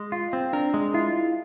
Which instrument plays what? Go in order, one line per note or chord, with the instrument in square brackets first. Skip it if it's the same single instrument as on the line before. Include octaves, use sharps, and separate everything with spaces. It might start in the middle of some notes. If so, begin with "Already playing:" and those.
Already playing: [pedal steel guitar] G#3
F4
C4
[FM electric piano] D4 [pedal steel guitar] A#4
[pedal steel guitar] G#3
[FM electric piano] E4 [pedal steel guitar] F4